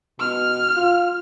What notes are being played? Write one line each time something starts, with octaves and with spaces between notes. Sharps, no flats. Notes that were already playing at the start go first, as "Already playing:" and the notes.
B2 F6
F4